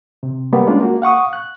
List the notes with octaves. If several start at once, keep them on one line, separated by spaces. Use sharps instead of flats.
C3
G3 A#3 B3
G#3 C#4 D4 F4
A#3 F#4
F5 F#5 C#6 D#6
F#6